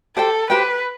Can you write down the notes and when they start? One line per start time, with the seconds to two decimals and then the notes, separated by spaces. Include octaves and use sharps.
0.16 G4 A4 C5 G5
0.50 G4 B4 C5 G5